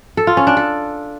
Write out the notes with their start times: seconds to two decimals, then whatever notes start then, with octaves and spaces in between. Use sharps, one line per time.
0.17 A4
0.27 F4
0.37 C#4
0.47 D4
0.57 A4